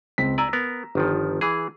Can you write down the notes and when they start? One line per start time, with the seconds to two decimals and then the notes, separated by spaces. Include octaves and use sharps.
0.18 C#2 C4 B6
0.38 D5 G#5 A#5 E6
0.53 B3 A#4
0.95 G1 D#3 F3
1.41 E3 G#4